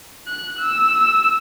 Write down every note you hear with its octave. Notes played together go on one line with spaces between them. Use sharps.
F#6
E6